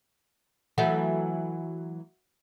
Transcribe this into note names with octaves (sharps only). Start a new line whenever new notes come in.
E3 F#3 A3 F#4 E5 F#5